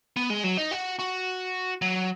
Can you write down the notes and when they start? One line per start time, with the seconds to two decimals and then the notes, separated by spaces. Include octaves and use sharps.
0.17 B3
0.30 G#3
0.44 F#3
0.58 D#4
0.72 F#4
0.99 F#4
1.82 F#3